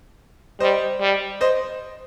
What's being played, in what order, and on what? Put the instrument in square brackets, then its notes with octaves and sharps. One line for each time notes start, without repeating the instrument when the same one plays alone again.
[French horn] G3 [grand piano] C5 D#5
[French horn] G3
[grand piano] C5 D#5